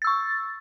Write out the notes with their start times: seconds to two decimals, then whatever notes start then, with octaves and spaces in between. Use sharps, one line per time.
0.02 A6
0.04 E6
0.07 C#6